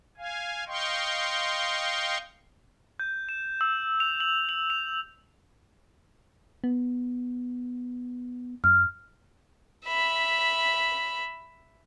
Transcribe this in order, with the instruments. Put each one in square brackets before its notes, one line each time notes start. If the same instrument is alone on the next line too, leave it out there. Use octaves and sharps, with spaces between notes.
[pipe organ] F5 G#5
D#5 F5 G5 C6 C#6
[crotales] G6
E7
E6
F7
F#7
F#7
F7
[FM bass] B3
[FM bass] F#2 [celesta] F6
[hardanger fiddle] E5 B5